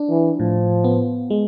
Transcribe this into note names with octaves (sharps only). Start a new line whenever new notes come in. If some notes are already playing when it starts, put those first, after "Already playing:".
Already playing: D4
E3
A2 F3
B3
G#3